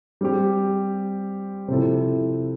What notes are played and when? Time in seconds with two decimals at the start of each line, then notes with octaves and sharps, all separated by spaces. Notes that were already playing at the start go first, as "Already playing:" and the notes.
0.21 G3 C4 G4
1.68 C3 F3 C4 E4 A4